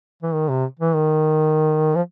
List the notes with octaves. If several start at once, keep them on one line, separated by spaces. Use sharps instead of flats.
E3
D#3
C3
E3
D#3
F3